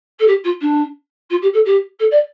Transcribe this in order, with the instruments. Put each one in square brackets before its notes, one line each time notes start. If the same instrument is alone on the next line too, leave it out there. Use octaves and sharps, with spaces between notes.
[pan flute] A4
G4
F4
D4
F4
G4
A4
G4
A4
D5